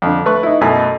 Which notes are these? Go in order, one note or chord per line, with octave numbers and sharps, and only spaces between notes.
F2 D3
A3 B4 C#6
D#4 E4
F#2 B2 A3 G#5